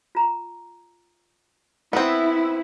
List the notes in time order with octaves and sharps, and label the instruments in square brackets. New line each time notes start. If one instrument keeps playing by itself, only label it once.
[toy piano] F4 A#5
[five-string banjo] B3 C4 [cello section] E4